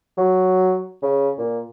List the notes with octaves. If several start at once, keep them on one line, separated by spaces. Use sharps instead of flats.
F#3
C#3
A#2